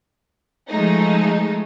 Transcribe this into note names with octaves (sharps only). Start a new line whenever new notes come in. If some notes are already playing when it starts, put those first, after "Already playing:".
F3 G#3 A3 D#4